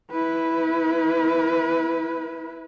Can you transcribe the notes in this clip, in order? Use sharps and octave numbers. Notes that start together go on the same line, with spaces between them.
E4 B4